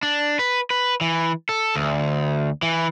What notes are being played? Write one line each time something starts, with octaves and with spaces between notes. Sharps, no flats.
D4
B4
B4
E3
A4
D2
E3